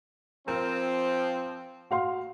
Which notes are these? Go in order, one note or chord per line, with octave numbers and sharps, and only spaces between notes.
F3 C4 A#4
F#4 F5 C6